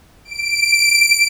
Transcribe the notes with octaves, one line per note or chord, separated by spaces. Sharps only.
D7